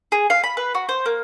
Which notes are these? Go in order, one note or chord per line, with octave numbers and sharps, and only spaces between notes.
G#4
F5
B5
B4
F#4
C5
A#3